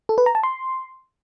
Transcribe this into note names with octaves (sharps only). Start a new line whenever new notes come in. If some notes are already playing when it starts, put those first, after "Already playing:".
A4
B4
A#5
A5
C6